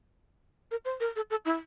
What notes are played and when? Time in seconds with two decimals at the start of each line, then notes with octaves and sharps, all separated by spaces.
0.71 A#4
0.85 C5
1.00 A#4
1.16 A4
1.30 A4
1.45 E4